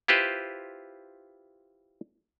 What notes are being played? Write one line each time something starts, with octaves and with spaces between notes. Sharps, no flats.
E4 F4 G4 B4 C5